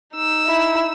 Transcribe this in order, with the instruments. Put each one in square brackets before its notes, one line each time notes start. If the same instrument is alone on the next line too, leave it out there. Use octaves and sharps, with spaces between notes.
[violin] D#4 E6
[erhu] E4